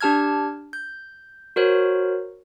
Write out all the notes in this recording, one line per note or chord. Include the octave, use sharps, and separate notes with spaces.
D4 G4 A5 F6 G#6
G6
F#4 A#4 C5 C#5